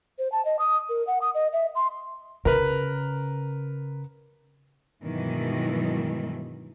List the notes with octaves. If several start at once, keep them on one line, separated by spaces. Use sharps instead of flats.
C5
A5
D#5
D#6
A#4
F#5
D#6
D#5
E5
C6
C#3 A#4 B4
G2 B2 D#3 E3 F#3 G#3